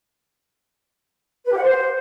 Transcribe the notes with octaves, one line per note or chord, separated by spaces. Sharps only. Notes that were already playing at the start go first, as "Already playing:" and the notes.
B4
G4
F#5
C5